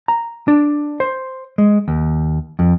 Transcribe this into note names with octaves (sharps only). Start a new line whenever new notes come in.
A#5
D4
C5
G#3
D#2
F2